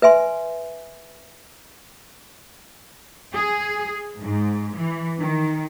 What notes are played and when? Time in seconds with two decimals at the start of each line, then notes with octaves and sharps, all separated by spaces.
0.02 B4 E5 G#5 C6
3.34 G#4
4.20 G#2
4.77 E3
5.20 D#3